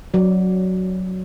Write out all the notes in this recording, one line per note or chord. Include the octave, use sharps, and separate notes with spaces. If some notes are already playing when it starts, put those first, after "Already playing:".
F#3 D5